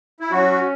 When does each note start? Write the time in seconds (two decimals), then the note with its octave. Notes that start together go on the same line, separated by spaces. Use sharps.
0.20 E4
0.31 F#3 C#4 F#4